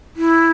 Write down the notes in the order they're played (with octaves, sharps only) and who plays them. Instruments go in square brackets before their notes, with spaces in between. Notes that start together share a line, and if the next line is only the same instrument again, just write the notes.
[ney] E4